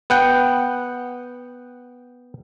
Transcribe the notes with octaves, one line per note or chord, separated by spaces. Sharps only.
B3 F#5 G5